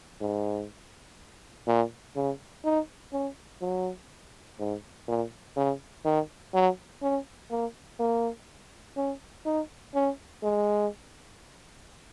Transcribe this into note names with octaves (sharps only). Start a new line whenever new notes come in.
G#2
A#2
C#3
D#4
C#4
F#3
G#2
A#2
C#3
D#3
F#3
C#4
A#3
A#3
C#4
D#4
C#4
G#3